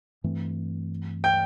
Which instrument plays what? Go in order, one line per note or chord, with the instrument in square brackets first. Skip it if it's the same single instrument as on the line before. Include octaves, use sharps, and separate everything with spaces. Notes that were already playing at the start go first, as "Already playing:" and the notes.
[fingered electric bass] G2 E3 A3 C4
[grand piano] G5 G6